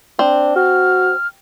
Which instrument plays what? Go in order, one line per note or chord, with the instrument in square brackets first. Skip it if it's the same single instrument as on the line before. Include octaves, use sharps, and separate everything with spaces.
[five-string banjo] C4 [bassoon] D4
[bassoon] F#4 [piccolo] F6